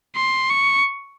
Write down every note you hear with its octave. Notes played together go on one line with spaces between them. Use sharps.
C6
C#6